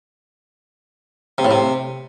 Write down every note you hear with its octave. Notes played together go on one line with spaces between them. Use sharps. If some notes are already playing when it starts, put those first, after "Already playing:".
C3
A2
C3